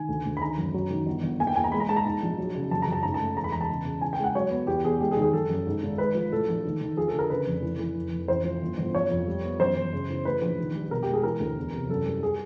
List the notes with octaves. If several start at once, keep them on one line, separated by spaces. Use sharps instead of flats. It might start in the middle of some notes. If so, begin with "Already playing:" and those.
Already playing: D#3 G#5
D2
D2
B5
D#3 A#5
F#2
F#3
D#3
G1
G1
A#3 G#5
G5
E2 G#5
A#5
G#3 B5
A#5
G#3 A5
A#5
G#2 A5
A#1
F#3
C#3
F#1 A5
A#5
F#2
A5
G#2 A#5
A5
A3
E1 A#5
B5
E1 A#5
A5
C#3
C#3
E3 G#5
G5
G#3 F#5
F#3 C#5
B3
E2 G4
E2 G#4
G#3 G4
G#4
D#3
G#4
F#1 A4
F#2
G#2
G#1
G#3 B4
F3
A2 A4
A#1
D#3
D#3
F3 G#4
A4
D3
A#4
C#3 B4
F1
E3
E3
F1
F1
A1 C5
F3
G1
G1
F3 C#5
F2
G3
B3
F#2 C5
F#2
C#3
E3
A3 B4
A#1
D#3
G3
B2 A#4
G4
G#3
G#4
E3 A#4
D2
E2
C3
F#2 A4
G3
G#4